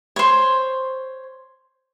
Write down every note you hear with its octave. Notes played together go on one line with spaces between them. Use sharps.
C5 C#5